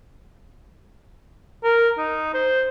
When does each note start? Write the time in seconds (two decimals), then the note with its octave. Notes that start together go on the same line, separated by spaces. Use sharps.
1.64 A#4
1.98 D#4
2.34 C5